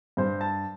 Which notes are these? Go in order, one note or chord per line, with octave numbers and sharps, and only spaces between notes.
G2 C5
A5